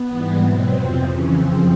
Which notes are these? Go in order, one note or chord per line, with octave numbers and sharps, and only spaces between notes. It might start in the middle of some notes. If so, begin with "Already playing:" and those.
Already playing: B3
G#2 E3 G3
B2 F#3 C4
F2 C3 F3
F2 C#3 E3 C#4
F#2 C#3 F3 C4